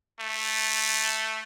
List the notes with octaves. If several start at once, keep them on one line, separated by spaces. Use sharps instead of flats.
A3